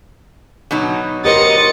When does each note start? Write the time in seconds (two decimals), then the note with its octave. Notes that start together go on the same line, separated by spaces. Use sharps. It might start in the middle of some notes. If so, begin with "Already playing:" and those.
0.71 B2 F#3 D#4
1.25 G4 A#4 C5 D#5 A6 C#7